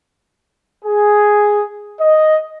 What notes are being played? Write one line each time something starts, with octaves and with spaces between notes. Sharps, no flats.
G#4
D#5